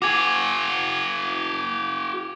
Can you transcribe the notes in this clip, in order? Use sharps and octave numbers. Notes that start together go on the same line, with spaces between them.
F#4 G#4 D6 G#6